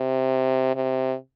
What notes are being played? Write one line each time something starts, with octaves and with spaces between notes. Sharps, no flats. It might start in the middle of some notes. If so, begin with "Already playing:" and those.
Already playing: C3
C3